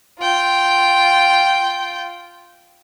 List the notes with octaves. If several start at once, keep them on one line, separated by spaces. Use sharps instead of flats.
F4 G5